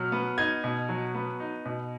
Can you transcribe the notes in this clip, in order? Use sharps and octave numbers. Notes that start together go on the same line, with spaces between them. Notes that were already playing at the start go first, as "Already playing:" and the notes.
Already playing: B2 F#3 F6
B3
D#4 G#6
B2
F#3
B3
D#4
B2